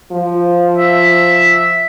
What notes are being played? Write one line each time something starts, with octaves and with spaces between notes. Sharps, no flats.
F3
E5